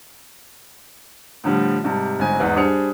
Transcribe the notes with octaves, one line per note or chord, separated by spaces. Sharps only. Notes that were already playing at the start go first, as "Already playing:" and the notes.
A2 D3 F3 G3
G#2 C3 G3 A5
G1 G#2 C4 G#5
E2 G#2 G#3 B4
G3 D4 G#4 C5 C#7 F7